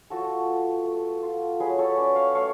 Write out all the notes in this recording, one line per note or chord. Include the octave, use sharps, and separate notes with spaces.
F3 F#4 A4
B3
A3
F4
F#3 G#4 B4
A4 C#5
C#4 B4 D5
C#5 F5
A3 C#5 F5